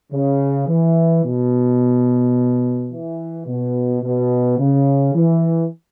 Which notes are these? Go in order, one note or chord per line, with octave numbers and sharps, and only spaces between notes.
C#3
E3
B2
E3
B2
B2
C#3
E3